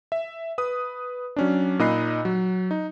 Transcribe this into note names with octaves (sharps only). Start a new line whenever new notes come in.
E5
B4 D#6
F#3 C#4 D4
A#2 D#4 D#5 B5 F#6 C7
F#3
D#4